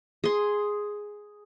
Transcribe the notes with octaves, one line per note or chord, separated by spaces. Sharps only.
G#4 C6